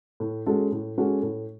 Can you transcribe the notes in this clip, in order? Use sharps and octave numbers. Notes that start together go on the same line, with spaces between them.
A2
G#3 C#4 F#4 A4
A2
G#3 C#4 F#4 A4
A2